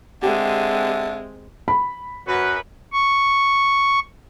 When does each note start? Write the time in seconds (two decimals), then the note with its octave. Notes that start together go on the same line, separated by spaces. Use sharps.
0.22 D3 G#3 C4 G4 E5
1.68 B5
2.28 F#2 F#4 B4
2.92 C#6